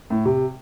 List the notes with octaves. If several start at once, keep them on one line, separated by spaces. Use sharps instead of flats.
A2
C3